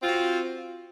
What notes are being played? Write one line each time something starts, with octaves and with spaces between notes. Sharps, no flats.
C4 F4 F#4